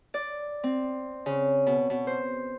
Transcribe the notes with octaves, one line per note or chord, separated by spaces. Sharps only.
D5
C4
C#3
B2
B2
C5